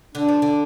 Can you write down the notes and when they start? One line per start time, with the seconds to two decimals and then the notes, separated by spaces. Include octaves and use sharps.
0.15 D3 D4
0.28 F3
0.42 D3